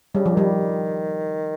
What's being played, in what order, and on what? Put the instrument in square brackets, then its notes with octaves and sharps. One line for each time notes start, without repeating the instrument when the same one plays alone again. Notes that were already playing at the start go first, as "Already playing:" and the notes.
[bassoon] C#3 [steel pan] G3
[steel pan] F3
[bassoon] D#3 [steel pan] G3